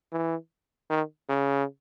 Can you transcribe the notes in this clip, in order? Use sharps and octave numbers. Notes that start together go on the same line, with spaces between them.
E3
D#3
C#3